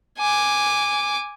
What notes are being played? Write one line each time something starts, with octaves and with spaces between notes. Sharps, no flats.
G#5 D6